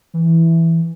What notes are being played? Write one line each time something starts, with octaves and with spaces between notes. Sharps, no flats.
E3